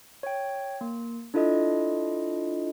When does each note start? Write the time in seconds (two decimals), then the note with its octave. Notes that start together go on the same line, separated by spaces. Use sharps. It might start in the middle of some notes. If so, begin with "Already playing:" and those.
0.23 C#5 G5
0.81 A#3
1.34 D4 E4 F4 A4 D#5